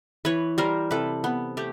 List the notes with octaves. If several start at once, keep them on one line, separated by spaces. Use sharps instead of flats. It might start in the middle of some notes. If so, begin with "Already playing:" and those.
E3 B4 C#5
G3 A#4 C5
C3 A4 B4
B3
A3 G4